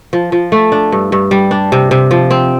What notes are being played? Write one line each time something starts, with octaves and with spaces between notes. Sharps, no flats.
F3
F3
A3
D4
G2
G2
G3
D4
C3
C3
F3
C4